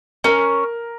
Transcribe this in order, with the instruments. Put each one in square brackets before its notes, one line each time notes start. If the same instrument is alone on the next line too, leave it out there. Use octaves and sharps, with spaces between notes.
[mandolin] C#4 [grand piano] A#4